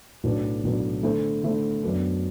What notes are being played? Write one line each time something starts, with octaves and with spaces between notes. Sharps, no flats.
B1 A2 F#3 B3 D4
B1 A2 F#3 B3 D4
D3 A3 E4 A4 C5
D3 A3 E4 A4 C5
F#2 F#3 B3 D4